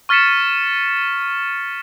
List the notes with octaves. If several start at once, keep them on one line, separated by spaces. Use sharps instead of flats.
C#6 F6 A6 B6 C#7 E7